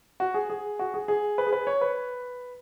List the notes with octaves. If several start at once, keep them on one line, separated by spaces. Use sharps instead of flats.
F#4
G#4
G#4
F#4
G#4
G#4
B4
G#4
B4
C#5
B4